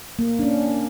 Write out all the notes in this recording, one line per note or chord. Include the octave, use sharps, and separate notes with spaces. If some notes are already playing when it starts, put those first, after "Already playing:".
A#3
C#4 D4